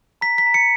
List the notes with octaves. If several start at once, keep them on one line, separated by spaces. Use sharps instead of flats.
A#5 B6
B6
A#5
C#7